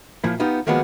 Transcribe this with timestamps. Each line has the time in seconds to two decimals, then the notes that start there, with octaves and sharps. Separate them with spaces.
0.24 A#2 F3 E4
0.40 B3 D#4 F4 G4
0.67 D#3 F3 F#3 G#3 A#3 B3